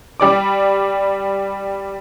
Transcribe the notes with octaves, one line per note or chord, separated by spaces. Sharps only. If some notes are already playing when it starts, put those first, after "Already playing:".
G3 D5 D6